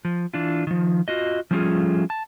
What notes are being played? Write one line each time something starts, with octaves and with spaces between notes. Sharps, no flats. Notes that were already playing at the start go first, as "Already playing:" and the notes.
F3
E3 D4 F4
D#3 F3
F4 F#4 D#5
F3 G3 A3 C#4 F4 G#4
A5